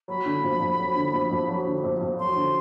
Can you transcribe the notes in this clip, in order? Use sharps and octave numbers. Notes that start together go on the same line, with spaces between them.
F#3 B5
D3
F2
F2
F#3
D3
F2
F2
F#3
D3
F2
F2
F#3 C6
D3